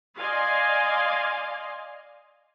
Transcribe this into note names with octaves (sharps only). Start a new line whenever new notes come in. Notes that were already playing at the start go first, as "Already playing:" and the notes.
D5 D#5 F5 G#5 C6